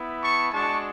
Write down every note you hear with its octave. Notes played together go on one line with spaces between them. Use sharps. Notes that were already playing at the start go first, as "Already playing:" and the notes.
Already playing: B3 E4
A5 C#6
G#3 D4 F#4 A5 C#6